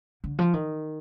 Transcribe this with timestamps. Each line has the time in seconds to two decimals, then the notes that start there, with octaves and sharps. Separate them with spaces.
0.24 D3
0.39 F3
0.53 D#3